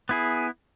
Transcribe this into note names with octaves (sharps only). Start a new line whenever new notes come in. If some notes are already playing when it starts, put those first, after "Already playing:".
B3 E4 G#4